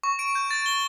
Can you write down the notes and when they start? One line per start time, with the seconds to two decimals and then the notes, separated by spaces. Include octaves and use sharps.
0.03 C#6
0.19 D7
0.35 G6
0.51 A6
0.66 G7